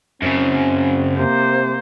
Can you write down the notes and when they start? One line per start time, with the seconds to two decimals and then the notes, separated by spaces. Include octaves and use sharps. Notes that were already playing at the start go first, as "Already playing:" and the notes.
0.22 F#2 C#3 C4
1.17 C3 A#3 C5